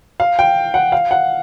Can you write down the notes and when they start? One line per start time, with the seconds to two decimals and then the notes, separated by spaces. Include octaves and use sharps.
0.20 F5
0.39 G5
0.74 F#5
0.92 F5
1.11 F#5